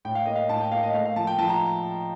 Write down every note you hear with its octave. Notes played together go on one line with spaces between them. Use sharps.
A2 G5
F5
A#3 D#5
F5
A2 A5
G5
A#3 F5
D#5
A3 F5
F5
F3 A5
G5
F3 A5
A#5